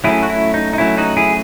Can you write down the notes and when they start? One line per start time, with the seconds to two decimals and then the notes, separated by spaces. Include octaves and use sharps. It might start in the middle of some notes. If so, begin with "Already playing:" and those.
0.04 F#3 A3 C#4 E4 G#4
0.23 F#4
0.30 E4
0.54 D#4
0.73 D#4
0.78 F#3 A3 C#4 E4
0.97 D#4 F#4
1.17 E4 G#4